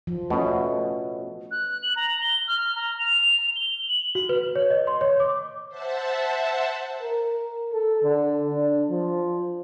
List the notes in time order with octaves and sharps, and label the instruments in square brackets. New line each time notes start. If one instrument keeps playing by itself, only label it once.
[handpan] F3
[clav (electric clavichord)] B2 [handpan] A3 C#4
[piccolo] F#6
F#7
A#5
G7
F6
A#5
F7
G7
F#7
[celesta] F#4
B4
C#5
D#5
C6
C#5
D6
[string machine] C5 E5 F#5 A5
[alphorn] A#4
A4
D3
D4
F3